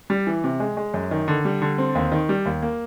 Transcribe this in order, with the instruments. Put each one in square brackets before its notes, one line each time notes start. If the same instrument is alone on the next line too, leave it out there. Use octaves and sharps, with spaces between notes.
[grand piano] G3
E3
C3
G#3
G#3
F#2
D#3
D3
G3
D3
C4
D#2
D#3
G3
D#2
A#3